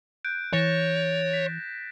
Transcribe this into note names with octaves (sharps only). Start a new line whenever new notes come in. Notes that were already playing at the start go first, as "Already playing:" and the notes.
F#6 G6 D7
E3 C#5 A6 A#6 E7
B6